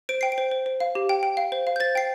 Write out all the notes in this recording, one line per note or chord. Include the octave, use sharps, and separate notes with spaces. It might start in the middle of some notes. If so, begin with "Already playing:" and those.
C5 D7
G5 C7
D7
C5
C5
C5
F5
G4
G5
G5
F5
C5
F5
G6
C5 A6
G5 C7